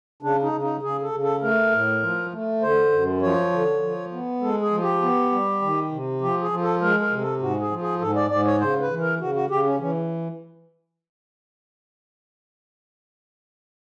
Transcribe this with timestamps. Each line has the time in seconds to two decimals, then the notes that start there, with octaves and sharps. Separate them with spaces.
0.23 C#3 D4
0.43 D#4
0.52 C#3
0.63 D#4
0.83 C#3 G#4
1.02 A4
1.12 C#3
1.22 A4
1.42 A3 A#4
1.72 A2
2.03 F3
2.33 A3
2.62 D3 C5
2.92 F#2
3.22 F3 C#5
3.52 D3
3.82 F3
4.12 B3
4.41 G#3 A4
4.62 G#4
4.71 F3
4.82 G4
5.02 B3
5.32 G3
5.62 D#3
5.92 C3
6.21 F3 G4
6.41 G#4
6.51 F3
6.62 A4
6.81 G#3 A#4
7.01 A#4
7.11 C3
7.21 A4
7.41 G#2 F#4
7.61 G#4
7.71 F3
7.81 G#4
8.00 G#2 A4
8.16 D5
8.31 G#2 D5
8.46 C#5
8.60 C#3 C5
8.81 B4
8.90 E3
9.01 A#4
9.20 C#3 F#4
9.35 F#4
9.50 C#3 G4
9.66 C#4
9.80 E3 C#4